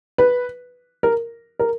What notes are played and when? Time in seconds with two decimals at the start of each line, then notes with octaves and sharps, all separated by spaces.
0.18 B4
1.03 A#4
1.59 A#4